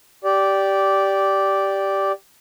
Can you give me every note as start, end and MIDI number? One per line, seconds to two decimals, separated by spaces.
0.24 2.12 67
0.24 2.12 74